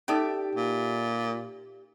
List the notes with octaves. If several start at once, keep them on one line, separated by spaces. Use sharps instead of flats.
C#4 D#4 G4 A4 D5 E5
A#2